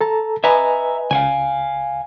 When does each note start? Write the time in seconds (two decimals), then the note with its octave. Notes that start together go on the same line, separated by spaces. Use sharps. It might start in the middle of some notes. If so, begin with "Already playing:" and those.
0.01 A4 A5 A#5
0.44 B4 D#5 E5 G#5 A#5
1.11 C#2 F5 F#5 G#5